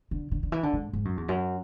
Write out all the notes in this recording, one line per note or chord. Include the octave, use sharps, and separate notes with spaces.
D3
D3
D3
E3
D3
G#2
G#2
F#2
E2
F#2